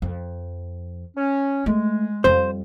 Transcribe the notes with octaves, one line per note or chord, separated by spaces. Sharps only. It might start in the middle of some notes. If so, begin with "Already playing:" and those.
F2
C#4
G#3 A3
F2 G3 C5